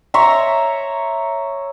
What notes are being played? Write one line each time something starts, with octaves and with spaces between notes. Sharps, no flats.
C#5 E5 A#5 C6